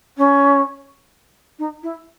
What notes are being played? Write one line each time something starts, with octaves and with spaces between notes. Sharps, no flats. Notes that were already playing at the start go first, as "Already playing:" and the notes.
C#4
D#4
E4